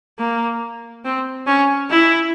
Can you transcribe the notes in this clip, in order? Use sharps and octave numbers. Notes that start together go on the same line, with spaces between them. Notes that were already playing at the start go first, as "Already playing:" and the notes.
A#3
C4
C#4
E4